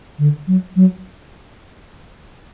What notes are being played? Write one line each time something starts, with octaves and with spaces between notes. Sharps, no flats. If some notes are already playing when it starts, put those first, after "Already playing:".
D3
F#3
F#3